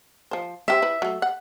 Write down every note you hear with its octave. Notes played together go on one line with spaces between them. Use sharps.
F3 C5
C#4 G4 C5 E5
E4 B4
F#3 A3
F#5